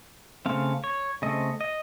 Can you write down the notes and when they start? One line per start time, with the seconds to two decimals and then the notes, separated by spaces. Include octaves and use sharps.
0.46 C#3 A3 C4 F5
0.84 C#5
1.22 C#3 A3 C4 D#5
1.61 D#5